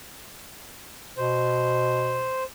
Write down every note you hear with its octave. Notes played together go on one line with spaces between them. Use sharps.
B2 C5